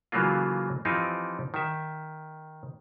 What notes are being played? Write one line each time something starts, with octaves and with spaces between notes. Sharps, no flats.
C#3 E3 F#3 A3 A#3 F4
E3 F3 C4 D#4 F4 G4
D#3 E5